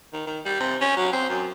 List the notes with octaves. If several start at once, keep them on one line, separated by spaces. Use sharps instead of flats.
D#3
D#3
G3
C3
C#4
F#3
C4
F#2